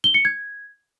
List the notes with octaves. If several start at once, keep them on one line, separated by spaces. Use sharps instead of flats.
G7
C#7
G#6